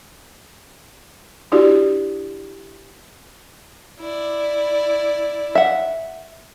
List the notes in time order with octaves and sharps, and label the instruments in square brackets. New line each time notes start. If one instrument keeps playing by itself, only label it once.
[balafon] D4 E4 F#4 G4 D5
[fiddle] E4 D5
[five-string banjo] E5 F#5